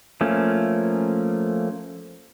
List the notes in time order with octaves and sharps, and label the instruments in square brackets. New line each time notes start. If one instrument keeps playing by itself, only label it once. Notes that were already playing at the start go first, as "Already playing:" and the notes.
[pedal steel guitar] F3 A3 A#3 C#4